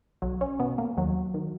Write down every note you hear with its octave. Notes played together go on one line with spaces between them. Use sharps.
B1 F#3
C#4
B2 B3
A#3
D#2 F#3
D#3